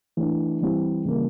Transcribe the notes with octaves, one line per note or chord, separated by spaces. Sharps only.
E3 A3 D4
E3 G3 C4 E4
C#3 E3 G3 A#3